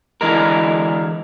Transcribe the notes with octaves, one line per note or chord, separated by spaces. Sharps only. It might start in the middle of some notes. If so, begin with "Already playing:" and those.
D3 E3 G#3 A#4